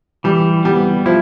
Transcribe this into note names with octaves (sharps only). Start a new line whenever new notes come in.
E3 G3
G3 B3
F3 E4